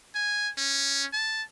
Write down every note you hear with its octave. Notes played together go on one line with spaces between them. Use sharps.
G#5
C#4
A5